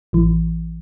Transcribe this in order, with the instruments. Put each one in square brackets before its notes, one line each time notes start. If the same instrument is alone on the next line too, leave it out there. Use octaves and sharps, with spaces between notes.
[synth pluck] A1 E3